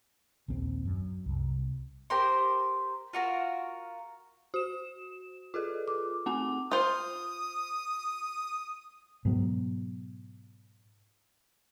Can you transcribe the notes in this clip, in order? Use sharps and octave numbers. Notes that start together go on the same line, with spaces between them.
A#1 D#2 C4
F#2
C2
G4 A#4 C5 C6
F4 F#4 A#4
F#4 E7
F4 G#4 A4
D6
A3 C4 G#5
F4 C5 D#6
G#2 B2 F#3